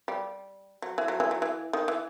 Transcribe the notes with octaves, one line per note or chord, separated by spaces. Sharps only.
G3
F#3
E3
F#3
E3
F#3
E3
D#3
E3